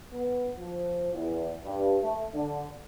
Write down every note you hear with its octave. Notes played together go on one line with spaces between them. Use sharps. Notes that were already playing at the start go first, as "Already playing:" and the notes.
B3
F3
E2
G2
A3
D3